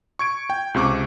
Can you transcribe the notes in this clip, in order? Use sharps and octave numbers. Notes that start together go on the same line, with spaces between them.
C#6 G#6 D7
G5
C#2 C3 C#6 D6